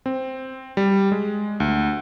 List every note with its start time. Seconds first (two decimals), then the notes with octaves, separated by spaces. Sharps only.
0.06 C4
0.77 G3
1.12 G#3
1.60 D2